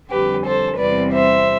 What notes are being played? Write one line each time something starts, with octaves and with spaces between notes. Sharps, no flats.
F2 D3 G3 G4 B4
A4 C5
E2 C3 G3 C4 B4 D5
C5 E5